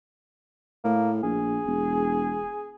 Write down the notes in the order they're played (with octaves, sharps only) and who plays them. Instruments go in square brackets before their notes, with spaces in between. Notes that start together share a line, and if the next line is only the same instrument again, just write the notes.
[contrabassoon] A2 [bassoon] A#3
[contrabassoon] A#1 [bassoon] G#4
[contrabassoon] E1